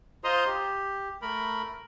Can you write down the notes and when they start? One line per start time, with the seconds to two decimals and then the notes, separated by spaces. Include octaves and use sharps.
0.24 F4 C5 D#5 A#5 C6 D#6
0.46 G4
1.22 A3 A#4 B5